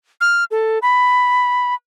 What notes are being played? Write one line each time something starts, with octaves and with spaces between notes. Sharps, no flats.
F6
A4
B5